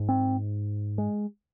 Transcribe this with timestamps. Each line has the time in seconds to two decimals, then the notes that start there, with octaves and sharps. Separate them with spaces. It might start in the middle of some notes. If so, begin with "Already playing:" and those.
Already playing: G#2
0.09 C4
0.98 G#3